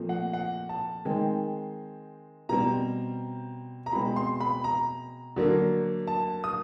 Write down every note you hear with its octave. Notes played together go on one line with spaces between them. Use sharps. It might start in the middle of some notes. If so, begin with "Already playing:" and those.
Already playing: A#2 F3 A3 C4
F#5
F#5
A5
D#3 G#3 C4
B2 G3 C4 A#5
A#5
B2 G#3 C4 B5
C6
B5
A#5
D3 F#3 A#3
A5
D#6